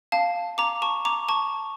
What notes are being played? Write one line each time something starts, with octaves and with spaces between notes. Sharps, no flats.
F5 A5
A#5 D6
A5 C#6
A#5 D6
A5 C#6